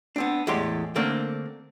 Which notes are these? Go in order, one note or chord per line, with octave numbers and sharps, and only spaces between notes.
B3 C4 D4
E2 A2 G#3 G4 C6
D3 A3 A#3 C4 D4 A#4